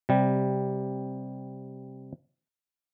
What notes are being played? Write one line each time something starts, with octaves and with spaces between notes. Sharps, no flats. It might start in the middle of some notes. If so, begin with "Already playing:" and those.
C3 G3